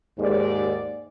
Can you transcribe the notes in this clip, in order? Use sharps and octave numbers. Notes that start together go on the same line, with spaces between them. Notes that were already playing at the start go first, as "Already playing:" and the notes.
D#2 G#2 D5